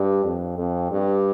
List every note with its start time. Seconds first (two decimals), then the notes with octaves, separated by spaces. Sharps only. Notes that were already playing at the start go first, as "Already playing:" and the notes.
Already playing: G2
0.25 F2
0.58 F2
0.91 G2